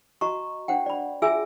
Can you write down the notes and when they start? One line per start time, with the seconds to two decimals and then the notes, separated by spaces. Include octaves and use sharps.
0.21 F#4 D#5 A#5 C#6
0.68 D4 C5 F#5 G5
0.86 D5 B5
1.22 F4 F#4 G#4 E5 G#5 E6